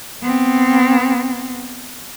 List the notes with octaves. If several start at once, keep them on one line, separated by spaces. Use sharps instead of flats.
B3 C4